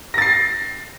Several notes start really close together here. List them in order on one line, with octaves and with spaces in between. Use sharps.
A#6 A6 C7